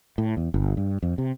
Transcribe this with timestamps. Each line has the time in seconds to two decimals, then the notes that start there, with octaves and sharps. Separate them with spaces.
0.18 A2
0.37 E2
0.54 G1
0.77 G2
1.03 F2
1.18 C3